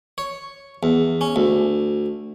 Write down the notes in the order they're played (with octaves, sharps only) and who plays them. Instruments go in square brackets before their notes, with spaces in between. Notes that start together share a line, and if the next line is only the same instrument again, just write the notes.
[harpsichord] C#5
E2
C#4
D2